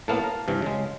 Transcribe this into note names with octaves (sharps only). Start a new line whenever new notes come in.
A2 A#3 B3 F5 A5
A#4
G2 C3 E3
C#3 G#3